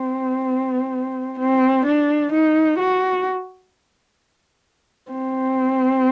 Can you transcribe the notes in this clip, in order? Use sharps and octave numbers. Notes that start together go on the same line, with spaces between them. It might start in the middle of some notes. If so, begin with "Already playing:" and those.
Already playing: C4
C4
D4
D#4
F#4
C4